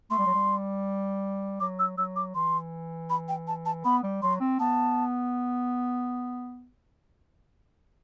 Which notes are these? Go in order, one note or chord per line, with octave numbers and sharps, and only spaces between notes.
A3 C6
G3
F#3
G3
F#3 D6
E6
F#3 E6
D6
E3 C6
B5
G5
A5
A5
B3 B5
G3
F#3 C6
C4
B3 A5